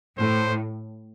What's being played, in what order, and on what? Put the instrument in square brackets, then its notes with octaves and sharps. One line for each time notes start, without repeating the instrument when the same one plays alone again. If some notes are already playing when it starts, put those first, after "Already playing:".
[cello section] A2 [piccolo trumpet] C5